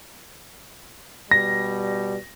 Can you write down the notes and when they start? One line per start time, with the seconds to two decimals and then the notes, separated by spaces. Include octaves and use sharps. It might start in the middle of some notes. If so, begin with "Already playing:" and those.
1.31 B2 G3 A#6